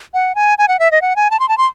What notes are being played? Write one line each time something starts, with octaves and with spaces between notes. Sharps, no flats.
F#5
G#5
G#5
F#5
E5
D#5
F#5
G#5
A5
C6
A5
C6